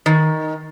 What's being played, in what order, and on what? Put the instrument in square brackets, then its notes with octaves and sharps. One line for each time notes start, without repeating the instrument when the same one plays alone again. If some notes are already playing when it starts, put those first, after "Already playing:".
[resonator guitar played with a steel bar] D#3